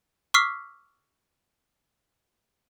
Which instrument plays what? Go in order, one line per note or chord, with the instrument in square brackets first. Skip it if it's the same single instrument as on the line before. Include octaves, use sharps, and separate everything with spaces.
[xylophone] C#6 D6 E6 F6 B6 C7